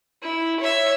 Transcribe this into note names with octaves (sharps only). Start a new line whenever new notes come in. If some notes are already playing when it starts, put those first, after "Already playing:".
E4
C#5 E5